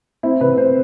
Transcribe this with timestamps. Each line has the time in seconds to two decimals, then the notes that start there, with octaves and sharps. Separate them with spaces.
0.23 C4 E4
0.41 C3 B4
0.57 C4 C5